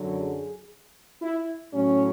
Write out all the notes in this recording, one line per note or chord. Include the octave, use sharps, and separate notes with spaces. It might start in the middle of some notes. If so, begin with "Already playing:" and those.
Already playing: F#2 D3 F#3
G#4
E4
A2 F#3 C#4